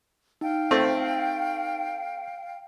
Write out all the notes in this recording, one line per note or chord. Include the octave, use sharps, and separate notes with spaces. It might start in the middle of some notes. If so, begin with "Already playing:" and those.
D#4 F5 G5
A3 C4